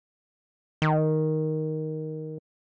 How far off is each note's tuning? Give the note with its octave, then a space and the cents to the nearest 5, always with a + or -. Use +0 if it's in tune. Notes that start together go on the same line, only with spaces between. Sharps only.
D#3 +5